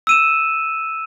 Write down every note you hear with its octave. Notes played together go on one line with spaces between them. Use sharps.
E6 D#7 E7